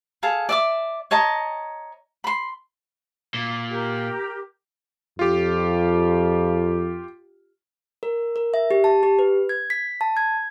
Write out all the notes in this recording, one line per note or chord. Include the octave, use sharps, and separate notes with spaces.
G#4 A4 F5
D5 E5 D6
C#5 D#5 A5 A#5
B5 C6
A#2
G4 A#4
F2 F4 G4
A#4
A#4
E5
G4
A5
G4
B4
G#6
B6
A5
G#6